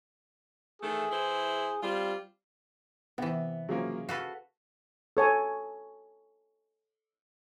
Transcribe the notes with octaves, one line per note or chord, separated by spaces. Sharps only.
D#3 E3 A3 G#4
E3 E4 C5
G3 C4 F4
C3 E3 B3
C#3 F3 F#3 A#3 C#4
F#4 A4 B4 F5
A4 C#5 G#5